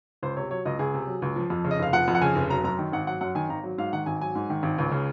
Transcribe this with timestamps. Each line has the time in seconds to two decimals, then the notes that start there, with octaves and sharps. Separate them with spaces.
0.23 C#2 C5
0.36 C3 C#5
0.50 F#3 C#5
0.65 C#2 D#5
0.79 C#2 G#4
0.94 C3
1.07 F#3
1.22 C#2
1.36 F3
1.50 F2
1.64 C#3
1.71 D#5
1.79 F1 F5
1.93 F3 F#5
2.08 F2
2.15 F#5
2.21 C#3 G#5
2.35 F1
2.50 F#3 A#5
2.64 F#2 A#5
2.79 D#3
2.93 G#1 F#5
3.07 F#3 F#5
3.21 F#2 F#5
3.35 D#3 G#5
3.49 G#1 A#5
3.63 F#3
3.78 G#2 F5
3.93 D#3 F#5
4.06 G#1 G#5
4.21 F#3 G#5
4.35 G#2
4.50 D#3
4.63 G#1
4.78 C#2
4.92 C#3